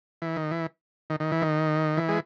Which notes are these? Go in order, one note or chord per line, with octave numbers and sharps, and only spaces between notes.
E3
D#3
E3
D#3
D#3
E3
D#3
E3
G#3